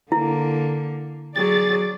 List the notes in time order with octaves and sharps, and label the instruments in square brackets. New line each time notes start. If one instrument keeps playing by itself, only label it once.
[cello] D3 A#3 [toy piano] E4
[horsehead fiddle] F#3 G#4 [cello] D5 [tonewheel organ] A6